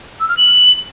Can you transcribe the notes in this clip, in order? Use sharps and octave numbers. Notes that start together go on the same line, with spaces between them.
E6
F6
F#7